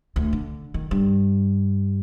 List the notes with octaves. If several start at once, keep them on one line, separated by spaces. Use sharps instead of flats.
D2
D3
D#3
G2